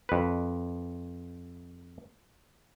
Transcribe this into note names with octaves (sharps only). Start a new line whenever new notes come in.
F2 B4